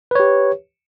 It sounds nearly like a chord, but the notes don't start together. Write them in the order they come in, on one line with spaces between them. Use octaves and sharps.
B4 C#5 G4